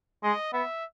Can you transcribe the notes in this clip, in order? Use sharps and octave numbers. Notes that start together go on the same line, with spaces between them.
G#3 D#5
B3 E5